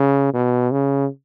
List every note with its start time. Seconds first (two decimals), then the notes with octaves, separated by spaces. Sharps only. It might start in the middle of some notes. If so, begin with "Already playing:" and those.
Already playing: C#3
0.33 B2
0.71 C#3